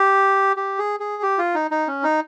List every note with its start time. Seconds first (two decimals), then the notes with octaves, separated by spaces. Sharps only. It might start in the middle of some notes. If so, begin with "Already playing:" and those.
Already playing: G4
0.56 G4
0.79 G#4
1.00 G#4
1.23 G4
1.38 F4
1.54 D#4
1.71 D#4
1.87 C#4
2.03 D#4